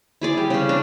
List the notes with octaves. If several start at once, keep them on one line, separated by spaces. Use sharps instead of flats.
E4 G#4 D5
G3
C#3 C#4
D4